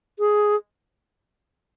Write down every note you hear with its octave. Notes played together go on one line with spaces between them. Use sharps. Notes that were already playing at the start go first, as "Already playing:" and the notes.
G#4